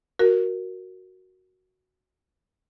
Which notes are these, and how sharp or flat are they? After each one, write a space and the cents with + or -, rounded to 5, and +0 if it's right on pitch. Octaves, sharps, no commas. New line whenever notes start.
F#4 +0 A#4 +0